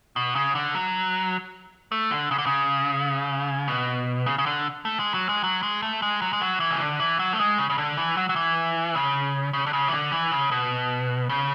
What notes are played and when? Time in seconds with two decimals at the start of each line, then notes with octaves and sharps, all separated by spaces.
0.16 B2
0.35 C#3
0.55 D3
0.75 F#3
1.92 A3
2.12 D3
2.31 C#3
2.38 D3
2.46 C#3
3.68 B2
4.26 C#3
4.38 C#3
4.46 D3
4.85 A3
5.00 G#3
5.14 F#3
5.29 G#3
5.44 F#3
5.63 G#3
5.82 A3
6.02 G#3
6.22 F#3
6.33 G#3
6.41 F#3
6.60 E3
6.70 C#3
6.80 D3
7.00 E3
7.19 F#3
7.33 A3
7.39 G#3
7.58 C#3
7.70 C#3
7.78 D3
7.97 E3
8.17 F#3
8.29 F#3
8.36 E3
8.95 C#3
9.53 C#3
9.66 D3
9.73 C#3
9.88 E3
9.93 D3
10.12 E3
10.31 C#3
10.51 B2
11.29 C#3